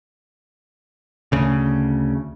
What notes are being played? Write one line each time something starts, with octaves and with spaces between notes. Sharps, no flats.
D2 C#3